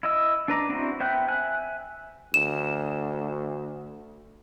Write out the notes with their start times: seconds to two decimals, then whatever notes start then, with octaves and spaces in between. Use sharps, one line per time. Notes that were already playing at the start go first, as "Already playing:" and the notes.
0.03 E4 D#5 E6
0.48 D4 B4 A#5 D6
0.69 C4 D4 E4 F#4 C5
1.00 B3 C5 E5 G5 F#6
1.28 E5 G#5 F#6
2.34 D2 E7